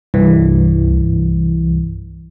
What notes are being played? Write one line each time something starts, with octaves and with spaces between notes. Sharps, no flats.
C2 G2 E3